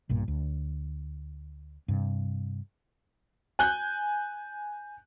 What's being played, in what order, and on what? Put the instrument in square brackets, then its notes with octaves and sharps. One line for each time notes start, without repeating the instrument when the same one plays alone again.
[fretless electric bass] B1 G2 A#2
D2
G2 C3
[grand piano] G#5 F#6 G6